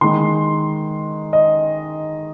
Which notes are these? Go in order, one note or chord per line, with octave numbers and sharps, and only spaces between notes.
D#3 G#3 C6
D#5